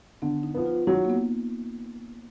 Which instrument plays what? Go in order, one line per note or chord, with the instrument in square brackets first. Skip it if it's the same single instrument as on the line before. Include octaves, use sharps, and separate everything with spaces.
[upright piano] D3 [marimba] B3
[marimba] D#4
[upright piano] F3 B3
[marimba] F4
[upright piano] F#3 [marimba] D#4
[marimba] A#3
B3